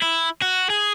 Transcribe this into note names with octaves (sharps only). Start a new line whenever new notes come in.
E4
F#4
G#4